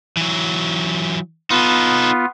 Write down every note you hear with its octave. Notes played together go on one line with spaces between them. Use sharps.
E3 F#3
B3 D#4 F4 A4